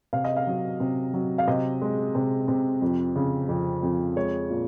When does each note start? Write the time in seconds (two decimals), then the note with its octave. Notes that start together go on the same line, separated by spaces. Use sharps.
0.13 C3 F5
0.24 D#5
0.36 F5
0.47 F#3
0.80 C3
1.14 F#3
1.38 F5
1.48 C3 D#5
1.82 G#3
2.15 C3
2.48 C3
2.82 F2
3.16 C#3
3.49 F2
3.83 F2
4.16 G#3 C#5
4.50 A#2